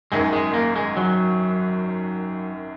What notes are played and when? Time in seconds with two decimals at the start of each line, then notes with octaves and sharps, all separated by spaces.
0.12 G#1 F#2 D#3 G#3
0.33 G#3
0.54 A#3
0.76 G#3
0.97 F#3